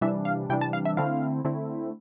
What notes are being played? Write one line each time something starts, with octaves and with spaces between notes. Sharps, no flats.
C3 E3 G3 D4 E5
F5
C3 E3 G3 D4 G5
A5
F5
E5
D3 A3 C4 E4 F5
D3 A3 C4 E4